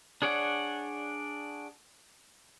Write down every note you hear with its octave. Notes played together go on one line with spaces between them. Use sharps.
D4 G#4 C#5 D5 F#5